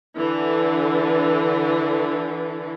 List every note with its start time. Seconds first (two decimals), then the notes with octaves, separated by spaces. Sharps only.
0.16 D3 E3